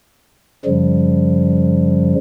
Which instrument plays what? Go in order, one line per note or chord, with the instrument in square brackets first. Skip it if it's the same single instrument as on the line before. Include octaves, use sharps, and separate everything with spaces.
[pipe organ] F#2 C#3 F3 G3